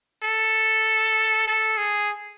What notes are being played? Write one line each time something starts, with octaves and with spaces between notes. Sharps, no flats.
A4
A4
G#4